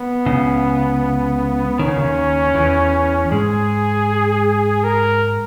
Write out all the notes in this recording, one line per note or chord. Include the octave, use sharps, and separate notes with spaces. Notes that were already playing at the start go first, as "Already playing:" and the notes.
Already playing: B3
C#2 C#3
D#3 C#4
C#3
D#2 D#3
E2 E3
G#2 G#3 G#4
A#4